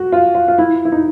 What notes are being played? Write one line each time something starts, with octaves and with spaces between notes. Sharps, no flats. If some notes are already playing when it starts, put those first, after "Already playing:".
Already playing: F#4
F4
F4
F4
E4
E4
D#4